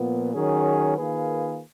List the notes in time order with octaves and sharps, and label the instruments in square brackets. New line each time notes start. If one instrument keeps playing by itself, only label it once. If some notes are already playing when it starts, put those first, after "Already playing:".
Already playing: [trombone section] A#2 F3 B3
D#3 F#3 C#4 G#4
D#3 A#3 F4 G#4 B4